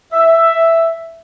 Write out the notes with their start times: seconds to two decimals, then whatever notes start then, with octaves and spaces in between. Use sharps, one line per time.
0.12 E5